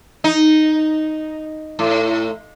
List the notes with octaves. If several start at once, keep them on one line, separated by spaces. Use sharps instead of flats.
D#4
A2